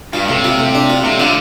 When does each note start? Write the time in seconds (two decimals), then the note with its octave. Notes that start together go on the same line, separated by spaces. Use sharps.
0.13 G2 F4
0.28 A2 C3
0.44 F4
0.59 A2
0.75 D4
0.90 F4
1.05 A2 C3
1.20 D3 F4